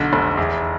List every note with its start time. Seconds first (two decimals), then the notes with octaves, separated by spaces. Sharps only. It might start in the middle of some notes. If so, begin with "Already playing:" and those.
Already playing: B1 D3
0.13 F1
0.37 E2